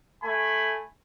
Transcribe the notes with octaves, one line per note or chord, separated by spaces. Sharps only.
A3 G#5 B5